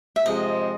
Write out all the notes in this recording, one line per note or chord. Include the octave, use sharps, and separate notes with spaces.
E5
C3 F3 G#3 C4 D#5